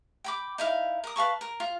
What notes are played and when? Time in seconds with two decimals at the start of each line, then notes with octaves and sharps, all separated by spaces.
0.24 G5 B5 D6
0.58 D#4 E4 F5
1.04 A#4 D#6
1.16 B4 F5 A5 C#6
1.41 A#4
1.60 F4